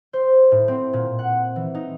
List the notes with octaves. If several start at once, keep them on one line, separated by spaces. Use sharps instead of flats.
C5
A2
C4
A#2
F#5
E3
D#4